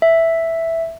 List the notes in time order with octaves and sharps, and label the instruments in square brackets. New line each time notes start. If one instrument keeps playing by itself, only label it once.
[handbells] E5